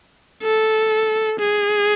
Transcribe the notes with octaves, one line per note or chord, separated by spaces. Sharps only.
A4
G#4